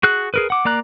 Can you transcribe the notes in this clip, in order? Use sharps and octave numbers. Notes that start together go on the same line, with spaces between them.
F#4 G#4 F#6
G#4 A#4 B4
F#5 D6
A#3 D5 A#5 F#6